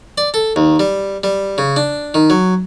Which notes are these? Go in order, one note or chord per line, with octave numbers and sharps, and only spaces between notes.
D5
A4
D#2
G3
G3
C#3
D4
D#3
F#3